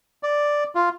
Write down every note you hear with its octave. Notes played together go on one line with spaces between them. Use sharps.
D5
F4